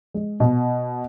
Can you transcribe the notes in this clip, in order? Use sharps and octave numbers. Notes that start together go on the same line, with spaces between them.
G#3
B2